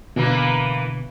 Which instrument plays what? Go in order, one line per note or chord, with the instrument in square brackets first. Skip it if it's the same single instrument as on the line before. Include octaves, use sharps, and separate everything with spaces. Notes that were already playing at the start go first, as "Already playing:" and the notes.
[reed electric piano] B2 D3 [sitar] E3 A#3 B4